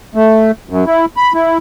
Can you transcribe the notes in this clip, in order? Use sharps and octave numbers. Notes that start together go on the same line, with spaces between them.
A3
F#2
E4
B5
E4